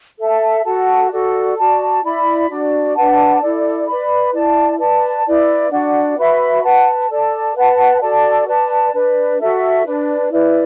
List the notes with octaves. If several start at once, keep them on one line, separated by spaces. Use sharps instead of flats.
A4 E5 A5
F#4 A4 F#5 A5
F#4 A4 D5
F#4 D5 A5
E4 D5 B5
D4 F#4 D5
D4 B4 F#5 A5
E4 A4 D5
B4 D5 B5
E4 D5 A5
B4 D5 A5
E4 B4 D5
D4 F#4 D5 F#5
F#4 B4 E5 B5
B4 F#5 A5
A4 D5 A5
B4 F#5 A5
F#4 A4 D5 A5
B4 D5 A5
D4 B4 D5
F#4 A4 E5
D4 B4 D5
E4 B4 D5